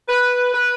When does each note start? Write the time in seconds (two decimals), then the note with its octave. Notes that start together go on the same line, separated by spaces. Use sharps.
0.09 B4
0.54 B4